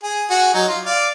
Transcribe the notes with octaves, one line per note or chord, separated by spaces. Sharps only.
G#4
F#4 G#4
F#3 D#4
F4
D5 F5